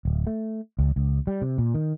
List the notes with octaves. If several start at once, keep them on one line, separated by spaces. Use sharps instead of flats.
D1
A3
C#2
C#2
G3
C3
A#2
D#3